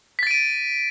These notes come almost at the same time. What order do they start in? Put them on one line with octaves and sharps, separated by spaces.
B6 A6 D7 D#7